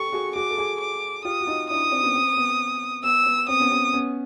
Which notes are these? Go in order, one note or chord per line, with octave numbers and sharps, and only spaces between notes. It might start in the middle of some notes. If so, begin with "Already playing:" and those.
Already playing: G4 A4 C#6
F#4 G#4
F#4 G#4 D6
A4
F#4 G#4
D6
F4 G4 D#6
F#4
D#4 F4
D4 E4 D#6
C4 D4
B3 C#4
C4
B3
B3 E6
B3
C4 D#6
B3 C#4
C4
B3 C#4